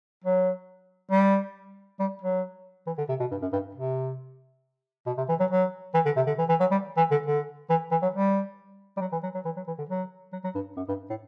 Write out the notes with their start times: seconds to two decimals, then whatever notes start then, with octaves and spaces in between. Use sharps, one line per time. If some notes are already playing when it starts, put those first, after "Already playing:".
0.24 F#3
1.11 G3
1.99 G3
2.22 F#3
2.86 E3
2.98 D3
3.09 C3
3.20 B2
3.31 G2
3.42 F#2
3.53 G2
3.75 C3
5.06 B2
5.18 C3
5.29 E3
5.40 F#3
5.51 F#3
5.94 E3
6.05 D3
6.16 C3
6.27 D3
6.38 E3
6.49 E3
6.60 F#3
6.71 G3
6.97 E3
7.11 D3
7.26 D3
7.69 E3
7.91 E3
8.02 F#3
8.14 G3
8.97 G3
9.01 F#3
9.12 E3
9.23 F#3
9.34 F#3
9.45 E3
9.56 F#3
9.67 E3
9.78 D3
9.89 F#3
10.32 F#3
10.44 F#3
10.55 G2
10.77 F#2
10.88 G2
11.09 A2